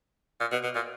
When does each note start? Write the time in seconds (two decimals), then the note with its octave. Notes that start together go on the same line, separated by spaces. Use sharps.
0.40 A#2
0.52 B2
0.64 B2
0.75 A#2